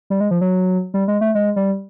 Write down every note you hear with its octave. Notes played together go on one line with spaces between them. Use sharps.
G3
G#3
F3
F#3
G3
G#3
A3
G#3
G3